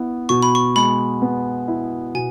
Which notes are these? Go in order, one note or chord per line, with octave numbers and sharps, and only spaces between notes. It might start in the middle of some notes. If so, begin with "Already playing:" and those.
Already playing: B3 E4
B2 C#6
B5
C#6
G#3 B5
B3
E4
B2 G#5